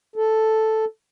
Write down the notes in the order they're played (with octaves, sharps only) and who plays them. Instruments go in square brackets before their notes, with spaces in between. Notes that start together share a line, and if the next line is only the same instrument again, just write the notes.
[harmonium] A4